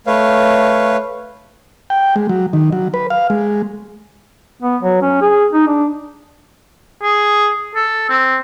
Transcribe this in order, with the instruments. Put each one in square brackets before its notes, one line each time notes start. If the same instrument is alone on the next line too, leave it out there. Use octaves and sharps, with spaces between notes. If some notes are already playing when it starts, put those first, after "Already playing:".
[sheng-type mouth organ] A3 B4 C#5 F5
[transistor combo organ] G5
G#3
F#3
D#3
F#3
B4
F5
G#3
[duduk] B3
F#3
C#4
G#4
D#4
D4
[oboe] G#4
A4
C4